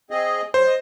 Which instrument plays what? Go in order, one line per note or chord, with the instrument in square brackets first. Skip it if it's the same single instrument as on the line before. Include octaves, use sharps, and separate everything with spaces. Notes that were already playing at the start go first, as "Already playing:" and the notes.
[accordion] C4 G#4 D#5
[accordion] F#3 [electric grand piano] C5
[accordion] D#5